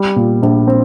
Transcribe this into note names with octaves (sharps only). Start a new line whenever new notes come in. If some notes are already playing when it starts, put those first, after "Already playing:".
Already playing: G3
A#2
A#1
C4